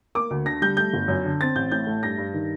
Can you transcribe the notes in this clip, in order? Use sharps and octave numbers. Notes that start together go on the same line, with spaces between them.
A#3 D6
D2
D3 A#6
G3 G6
A3 G6
G1
F#2
D3
C4 A6
A1 G6
A2 G6
A3
G2 A#6
G2
D#3